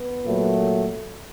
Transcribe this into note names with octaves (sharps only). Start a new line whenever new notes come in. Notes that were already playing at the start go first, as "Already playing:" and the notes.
Already playing: B3
A#2 F#3 A3